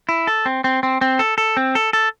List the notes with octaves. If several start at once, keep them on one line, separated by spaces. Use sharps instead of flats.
E4
A4
C4
C4
C4
C4
A4
A4
C4
A4
A4